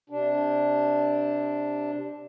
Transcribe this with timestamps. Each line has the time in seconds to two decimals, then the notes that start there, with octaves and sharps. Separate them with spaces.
0.10 C3 D4